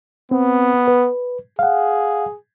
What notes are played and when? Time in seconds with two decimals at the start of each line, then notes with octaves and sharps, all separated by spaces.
0.31 B3 C4
0.88 B4
1.59 G#4 F5 F#5